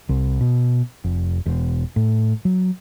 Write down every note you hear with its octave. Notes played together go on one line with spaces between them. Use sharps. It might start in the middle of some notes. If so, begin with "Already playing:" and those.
C2
B2
F1
E1
A2
F#3